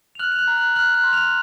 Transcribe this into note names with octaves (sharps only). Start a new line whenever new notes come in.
F7
F6 F#6 F#7
F7
F#6 F#7
A#5
F#6 F#7
F6 F#6 F#7
F#6 F#7
C6
F6 F7